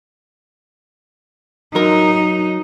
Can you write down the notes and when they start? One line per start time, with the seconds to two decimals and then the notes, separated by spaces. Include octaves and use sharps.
1.75 F#3 D#4 A#4